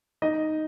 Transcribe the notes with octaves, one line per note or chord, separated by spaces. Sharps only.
D#4 D#5